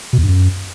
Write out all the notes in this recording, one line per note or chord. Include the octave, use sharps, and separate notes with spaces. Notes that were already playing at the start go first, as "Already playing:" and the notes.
B2
E2
G2
F#2